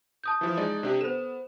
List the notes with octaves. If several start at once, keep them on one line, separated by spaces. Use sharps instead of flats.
A5 D#6 G6
E3 F3 E4
G#3 D#4 D5
C3 D4 G4
B3 A4 C5 E7